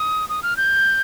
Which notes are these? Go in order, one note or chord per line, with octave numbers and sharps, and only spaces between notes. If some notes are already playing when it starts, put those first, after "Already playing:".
Already playing: D#6
D#6
F6
G6